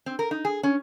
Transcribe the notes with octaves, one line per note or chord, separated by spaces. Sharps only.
C4
A#4
D#4
G#4
C#4